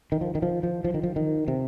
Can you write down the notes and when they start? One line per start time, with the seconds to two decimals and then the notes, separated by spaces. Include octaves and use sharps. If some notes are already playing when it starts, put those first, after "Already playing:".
0.12 D#3
0.21 F3
0.35 D#3
0.42 F3
0.63 F3
0.84 F3
0.94 D#3
1.03 F3
1.16 D#3
1.48 C3